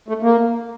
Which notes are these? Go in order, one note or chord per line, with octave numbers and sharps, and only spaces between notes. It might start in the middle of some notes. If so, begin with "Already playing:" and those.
A3
A#3